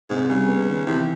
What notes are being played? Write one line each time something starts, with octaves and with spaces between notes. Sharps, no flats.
G#2 C3
C#3 G3
B3
D#3
C3 E3